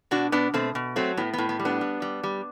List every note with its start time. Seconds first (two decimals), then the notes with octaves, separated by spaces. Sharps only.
0.11 B2 D4 F#4
0.32 B2 B3 D4
0.54 B2 A3 C4
0.75 B2
0.96 F#3 A3 C4
1.17 A2 B3
1.33 A2 B3
1.49 B3
1.59 G3
1.65 B3 D4
1.81 G3
2.02 G3
2.23 G3